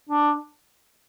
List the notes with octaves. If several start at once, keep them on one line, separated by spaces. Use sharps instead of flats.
D4